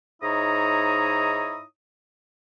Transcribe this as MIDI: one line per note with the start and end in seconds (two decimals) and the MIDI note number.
0.23 1.63 44
0.23 1.63 63
0.23 1.63 64
0.23 1.63 73
0.23 1.63 82
0.23 1.63 87